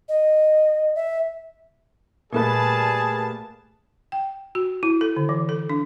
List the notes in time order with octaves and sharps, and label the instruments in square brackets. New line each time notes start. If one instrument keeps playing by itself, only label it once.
[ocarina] D#5
E5
[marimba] A#2 [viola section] G3 A5 [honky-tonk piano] A3 A#3 B4 [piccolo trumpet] G#4
[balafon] G5
F#4
E4
A4
D3
E3
A4
D4